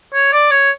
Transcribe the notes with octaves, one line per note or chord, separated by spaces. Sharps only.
C#5
D5
C#5